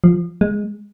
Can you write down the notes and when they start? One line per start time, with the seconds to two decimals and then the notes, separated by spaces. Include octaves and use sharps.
0.04 F3
0.41 G#3